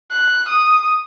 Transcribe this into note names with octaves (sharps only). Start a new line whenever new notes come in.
F#6
D#6